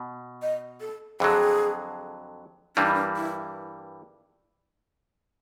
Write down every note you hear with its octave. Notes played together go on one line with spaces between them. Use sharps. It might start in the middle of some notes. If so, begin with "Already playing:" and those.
Already playing: B2
D#5
A4
F2 D3 F#3 G#4
G2 E3 G3 A#3 D4
D#4
D4
E4